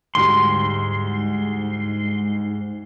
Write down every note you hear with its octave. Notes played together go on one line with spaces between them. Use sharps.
D2 G#2 G3 C6